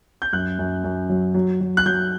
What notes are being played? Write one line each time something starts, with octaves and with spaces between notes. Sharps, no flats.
G6
F#2 F#6
F#2
F#2
F#3
F#3
F#3
F#6
F#3 G6